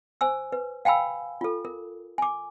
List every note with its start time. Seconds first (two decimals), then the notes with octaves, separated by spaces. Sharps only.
0.21 C5 G#5 E6
0.52 B4
0.85 F5 G5 G#5 B5 E6
1.41 F4 A4
1.65 A#4
2.18 G#5 D6